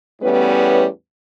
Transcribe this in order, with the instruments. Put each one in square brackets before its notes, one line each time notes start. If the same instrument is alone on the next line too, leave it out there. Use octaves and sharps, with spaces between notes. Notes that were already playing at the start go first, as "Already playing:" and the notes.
[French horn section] E2 A2 G3 B3 C#4 B4